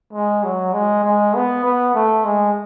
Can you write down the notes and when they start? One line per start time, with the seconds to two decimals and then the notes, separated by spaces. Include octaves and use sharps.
0.13 G#3
0.43 F#3
0.73 G#3
1.04 G#3
1.34 B3
1.64 B3
1.94 A3
2.25 G#3